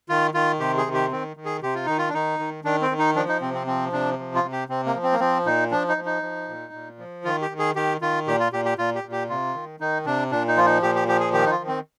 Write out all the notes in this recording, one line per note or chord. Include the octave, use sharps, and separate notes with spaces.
D#3 F4
D#3 F4
C3 G4
G#4
D#3
G4
D#3 C4
D#3
G#4
C3 G4
F4
D#3 D#4
F4
D4
D#3 D#4
D#3
D#3 D4
C4
D#3
D#4
F3 D4
D#4
C3 C4
C4
F3 C4
C3 D4
F3
F4
C3
G4
C3 C4
A#3
F3
C4
A#3
F3 C4
A#2 D#4
F3 D4
D#4
F3
D#4
F3
A#2
A#2
F3
D#3 F4
G4
D#3
G#4
D#3 G4
D#3 F4
A#2 G4
F4
A#2 G4
G4
A#2 F4
G4
A#2
G4
C3 F4
D#3
D#3 D#4
C3 D4
A#2 D4
D#4
F3 F4
D#4
A#2 G4
G4
F3 G4
G#4
D#3 G4
D#4
F4
D#3
C4